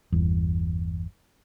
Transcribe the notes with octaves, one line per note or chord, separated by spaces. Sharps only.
G1 E2